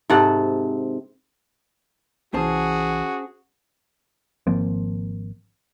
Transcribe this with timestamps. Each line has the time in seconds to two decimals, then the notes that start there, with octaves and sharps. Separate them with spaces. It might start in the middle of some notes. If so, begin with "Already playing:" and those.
0.10 G#2 C3 A4 F#5
2.34 C2 E3 C#4 F#4 G#4 C5 A5
4.47 G#1 F3 A#3 C4